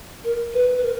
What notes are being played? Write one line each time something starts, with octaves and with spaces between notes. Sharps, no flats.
A#4
B4
B4
A#4